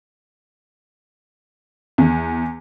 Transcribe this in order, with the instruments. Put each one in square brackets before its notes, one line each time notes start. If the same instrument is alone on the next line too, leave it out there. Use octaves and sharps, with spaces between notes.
[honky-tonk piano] E2